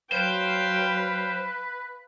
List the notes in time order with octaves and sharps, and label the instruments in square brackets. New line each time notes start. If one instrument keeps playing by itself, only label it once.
[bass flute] F#3 [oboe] B4 [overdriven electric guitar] C5 [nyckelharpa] F5 G5